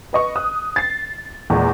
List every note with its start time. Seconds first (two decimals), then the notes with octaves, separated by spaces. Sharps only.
0.13 B4 D#5 C#6
0.35 D#6 F#6
0.76 A6 C7
1.50 E2 A#2 G#3